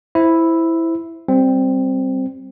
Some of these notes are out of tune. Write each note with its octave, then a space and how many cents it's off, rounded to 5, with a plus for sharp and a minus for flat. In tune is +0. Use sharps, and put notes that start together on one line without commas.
E4 +0 C5 +0 E5 +0
G3 -10 C4 +0